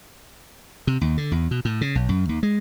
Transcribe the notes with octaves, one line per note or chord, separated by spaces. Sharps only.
C3
D#2
D3
E2
B2
A2
C#3
B1
F#2
D#2
G#3